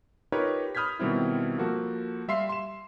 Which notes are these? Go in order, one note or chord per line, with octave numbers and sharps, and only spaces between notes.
D#4 F4 G4 A#4 B4 C#5
B5 D#6 F6 G6 G#6 B6
B2 D#3 G3 C4 E4
F3 A#3 F#4 A4
G3 E5 F5 C6 C7
C6 E7